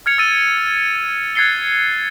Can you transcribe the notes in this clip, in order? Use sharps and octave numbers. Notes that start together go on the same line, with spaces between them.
F6 G#6 C#7 F7
E6 A6 D#7
F#6 G#6 A6 C7 C#7 G7